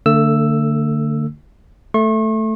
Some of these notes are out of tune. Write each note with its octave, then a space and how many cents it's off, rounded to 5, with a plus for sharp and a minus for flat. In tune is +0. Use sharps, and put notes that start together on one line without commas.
D3 +0 A3 +35 E6 +5
A3 +0 C#6 -40